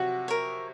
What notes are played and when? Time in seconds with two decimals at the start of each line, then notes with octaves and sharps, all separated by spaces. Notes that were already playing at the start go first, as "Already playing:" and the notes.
Already playing: C3 F3 F#3 F#4
0.28 A#4 C#5